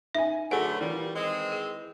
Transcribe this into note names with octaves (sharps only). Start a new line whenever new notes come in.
D#4 E5 G#5
D3 F#3 A3 G#4 B4 F#5
A#2 E3 G3
D#3 G#3 C4
G#4